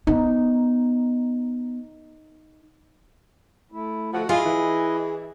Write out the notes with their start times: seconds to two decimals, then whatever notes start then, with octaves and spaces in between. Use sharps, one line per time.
0.07 B3 D#4
3.72 A3 E4
4.13 D3 F3 A3 F#4
4.29 E4 F4 G#4 D#5
4.45 E3